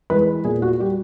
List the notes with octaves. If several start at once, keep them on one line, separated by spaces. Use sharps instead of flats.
E3 G#3 B4
A#2 G#4
F#4
G3 G4